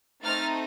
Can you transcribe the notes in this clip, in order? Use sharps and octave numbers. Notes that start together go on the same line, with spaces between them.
A3 C4 D#4 F6 A6